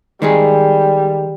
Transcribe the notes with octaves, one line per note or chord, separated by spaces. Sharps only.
D#3 G3 G#3 G#4